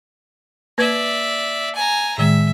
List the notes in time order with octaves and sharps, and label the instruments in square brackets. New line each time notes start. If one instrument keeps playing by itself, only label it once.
[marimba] A#3 B4 G#6 [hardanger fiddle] D5 E5
[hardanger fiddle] G#5 A#5
[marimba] A2 D#3 G#3 [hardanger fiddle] E5